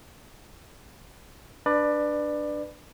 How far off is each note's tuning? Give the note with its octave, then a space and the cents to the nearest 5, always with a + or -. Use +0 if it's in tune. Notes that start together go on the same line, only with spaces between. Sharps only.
D4 +0 B4 +0 D5 +20